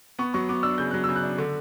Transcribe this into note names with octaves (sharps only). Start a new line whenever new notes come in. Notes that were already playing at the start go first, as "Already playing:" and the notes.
B3 C#6
F#3 C#6
B3 D6
D4 E6
C#3 G6
F#3 F#6
C#3 E6
F#6
D4
D3